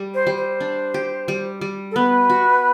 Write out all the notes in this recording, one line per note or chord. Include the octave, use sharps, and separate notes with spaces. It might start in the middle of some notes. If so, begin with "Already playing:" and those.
Already playing: G3
C5
G3
C5
D4
G4
G3
G3
A4
B3 B4
F#4